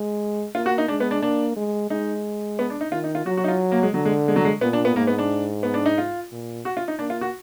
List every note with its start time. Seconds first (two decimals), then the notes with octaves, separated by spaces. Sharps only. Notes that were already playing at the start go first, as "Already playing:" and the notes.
Already playing: G#3
0.55 A#3 F4
0.66 F#4
0.78 D#4
0.88 G#3 D4
1.00 B3
1.11 D4
1.22 A#3 D4
1.57 G#3
1.90 G#3 D#4
2.59 B3
2.70 D4
2.81 D#4
2.92 D#3 F4
3.04 D#4
3.15 F4
3.26 F#3 F#4
3.37 F#4
3.44 D#4
3.48 F4
3.72 A#3
3.83 G#3
3.93 D3 F#3
4.05 G#3
4.28 G#3
4.36 F#3
4.45 G#3
4.61 A#2 B3
4.73 D4
4.85 B3
4.96 G#2 A#3
5.07 B3
5.18 D4
5.63 B3
5.74 D4
5.86 D#4
5.98 F4
6.32 A#2
6.65 F#4
6.77 F4
6.88 D#4
6.99 A#3 D4
7.10 F4
7.21 F#4